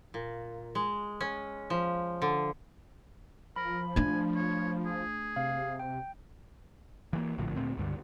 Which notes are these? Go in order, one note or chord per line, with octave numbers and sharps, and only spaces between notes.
A#2
G#3
C#4
F3
D3
F3 A#4 B5
A3 D4 G#5
C#5
G#4
C3 F5
G5
E3 G3 A#3
A#1 A2 D3 F3
D2 A#2 A3 C4
C#2 G2 D3